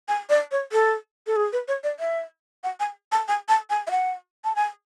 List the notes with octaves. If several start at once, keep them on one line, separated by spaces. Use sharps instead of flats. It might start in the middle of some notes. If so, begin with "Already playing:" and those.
G#5
D5
C#5
A4
A4
G#4
B4
C#5
D5
E5
F#5
G#5
A5
G#5
A5
G#5
E5
F#5
A5
G#5